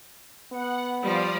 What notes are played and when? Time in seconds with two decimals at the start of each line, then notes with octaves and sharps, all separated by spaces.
0.52 B3 F#5
1.03 F3 G3 D5 F5 D#6